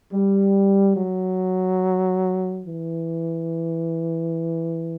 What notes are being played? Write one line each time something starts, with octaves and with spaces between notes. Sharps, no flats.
G3
F#3
E3